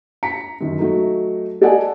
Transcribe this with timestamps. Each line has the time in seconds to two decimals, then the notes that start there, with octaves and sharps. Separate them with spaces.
0.23 A#5 B6 C#7
0.61 F#2 D#3
0.79 F#3 A3 D#4
1.62 A4 D5 D#5 F#5 G#5 A5